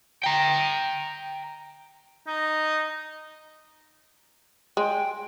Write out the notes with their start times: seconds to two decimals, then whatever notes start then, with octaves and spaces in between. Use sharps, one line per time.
0.24 G5 A#5
2.27 D#4
4.77 G#3 G5